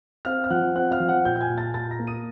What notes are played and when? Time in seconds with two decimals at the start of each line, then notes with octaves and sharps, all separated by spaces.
0.25 C4 F5 F6
0.44 F6
0.50 F3 F#5 F#6
0.75 C4 F#5 F#6
0.91 F5 F6
1.00 F3
1.08 F#5 F#6
1.25 A#2 G5 G6
1.36 G6
1.41 G#5 G#6
1.50 A#2
1.58 A5 A6
1.74 A#2 A5 A6
1.90 A#5 A#6
1.99 A#3
2.07 D#6 D#7